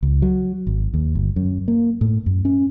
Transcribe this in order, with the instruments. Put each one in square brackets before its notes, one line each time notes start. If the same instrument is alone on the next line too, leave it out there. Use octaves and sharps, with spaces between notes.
[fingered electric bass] C#2
F#3
G#1
D#2
G1
F#2
A#3
A2
F#2
C#4